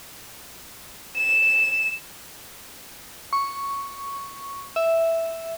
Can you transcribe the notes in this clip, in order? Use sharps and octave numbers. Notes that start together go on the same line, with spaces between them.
E7
C#6
E5